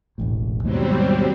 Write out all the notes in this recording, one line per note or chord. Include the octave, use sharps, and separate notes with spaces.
E1 A1 A2
D#2 G#2 B2 F#3 G3 C4